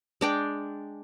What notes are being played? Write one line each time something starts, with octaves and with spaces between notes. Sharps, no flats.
G#3 D4 G5